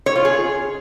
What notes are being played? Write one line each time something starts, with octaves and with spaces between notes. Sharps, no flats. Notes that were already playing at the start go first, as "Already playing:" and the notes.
C#5
F4
G#4